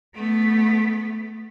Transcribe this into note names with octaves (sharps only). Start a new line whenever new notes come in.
A3 B3